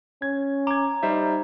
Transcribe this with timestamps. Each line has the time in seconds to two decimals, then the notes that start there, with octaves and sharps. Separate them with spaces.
0.22 C#4 G#6
0.67 A#5 D6 G#6
1.03 G3 D#4 C5 E5